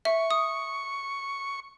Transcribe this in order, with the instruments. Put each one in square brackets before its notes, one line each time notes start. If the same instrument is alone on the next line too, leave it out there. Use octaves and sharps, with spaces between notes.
[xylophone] E5 [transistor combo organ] C#6
[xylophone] D#6